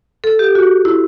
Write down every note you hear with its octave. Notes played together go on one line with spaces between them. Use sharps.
A4
G4
F#4
E4